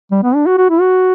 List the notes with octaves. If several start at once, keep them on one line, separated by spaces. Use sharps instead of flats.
G3
B3
D4
F#4
F#4
E4
F#4